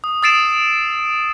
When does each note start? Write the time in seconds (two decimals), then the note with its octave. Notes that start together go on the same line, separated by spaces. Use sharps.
0.04 D#6
0.23 D#6 E6 A6 C7 D7 E7